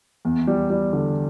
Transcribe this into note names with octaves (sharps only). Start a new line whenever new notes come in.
E2
G3
G3
D3